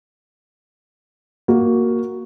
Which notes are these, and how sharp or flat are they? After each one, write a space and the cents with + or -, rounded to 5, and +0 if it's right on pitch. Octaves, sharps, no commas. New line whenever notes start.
A#3 +0 F#4 +0